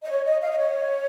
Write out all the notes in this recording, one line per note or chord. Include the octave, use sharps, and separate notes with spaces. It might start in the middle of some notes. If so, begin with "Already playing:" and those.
D#5
C#5
D#5
F5
D#5
C#5